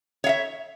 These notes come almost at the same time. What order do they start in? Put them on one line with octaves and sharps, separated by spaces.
C#5 F5 E5